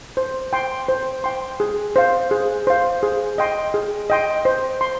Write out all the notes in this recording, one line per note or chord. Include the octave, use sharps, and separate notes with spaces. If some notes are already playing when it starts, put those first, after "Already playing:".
C5
G5 C6
C5
G5 C6
G#4
C5 F5
G#4
C5 F5
G#4
D#5 G5 C6
G#4
D#5 G5 C6
C5
C6